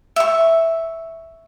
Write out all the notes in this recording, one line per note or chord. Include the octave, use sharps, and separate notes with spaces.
E5 C#6